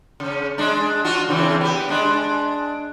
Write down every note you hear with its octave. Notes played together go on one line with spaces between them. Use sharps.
C#3 C#4
G#3 D4
D4 F4 F#4
C#3 E3 C4
B3 G4
G#3 D4